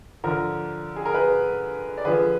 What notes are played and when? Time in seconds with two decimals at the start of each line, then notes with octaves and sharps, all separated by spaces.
0.24 D3 F3 A#4
0.96 G#4
1.05 A#4
1.14 G#4 B4
1.98 D5
2.05 D3 F3 G#4 B4